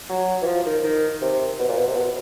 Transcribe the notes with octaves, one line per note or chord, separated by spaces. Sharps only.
F#3
E3
F3
D#3
D#3
C3
B2
A#2
B2
C3
B2